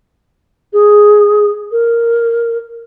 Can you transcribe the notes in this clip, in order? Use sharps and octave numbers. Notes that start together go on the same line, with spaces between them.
G#4
A#4